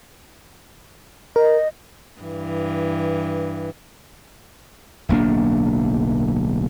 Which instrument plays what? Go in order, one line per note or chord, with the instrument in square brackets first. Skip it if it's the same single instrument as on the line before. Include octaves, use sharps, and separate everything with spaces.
[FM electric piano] A#4 [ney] D#5
[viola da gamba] G2 E3
[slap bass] D1 B1 A#3 D4